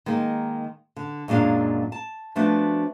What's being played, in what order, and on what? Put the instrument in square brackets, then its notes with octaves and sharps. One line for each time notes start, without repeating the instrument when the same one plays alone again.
[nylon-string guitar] D#3 G#3 A#3 D#4
D3
F#2 A#2 G#3 D4 F5
A5
F3 A3 B3 D4 F#4